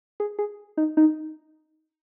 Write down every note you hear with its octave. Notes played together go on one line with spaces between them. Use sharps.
G#4
G#4
D#4
D#4